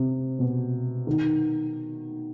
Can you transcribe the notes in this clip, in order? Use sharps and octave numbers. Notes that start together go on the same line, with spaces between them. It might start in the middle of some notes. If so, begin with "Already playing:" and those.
Already playing: C3
B2
D#3